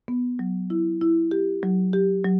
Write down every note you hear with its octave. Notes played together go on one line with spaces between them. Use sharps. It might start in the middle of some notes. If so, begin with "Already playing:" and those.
B3
F#3
E4
E4
G4
F#3
G4
F#3